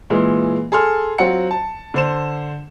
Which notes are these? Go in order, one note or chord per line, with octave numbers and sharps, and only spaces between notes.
A#2 E3 G#3
G#4 A4 C6 F6
F#3 C4 F4 F#5 C#7
A5
D3 C5 E7